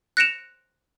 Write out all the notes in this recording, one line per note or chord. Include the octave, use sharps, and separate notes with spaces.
F#6 A#6 C#7 D7 E7 F7